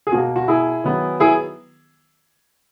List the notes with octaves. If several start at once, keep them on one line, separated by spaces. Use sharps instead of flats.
G#4
B2 A#3 F#4
F#4
E4 G#4
D#3 F#3 B3
E4 G#4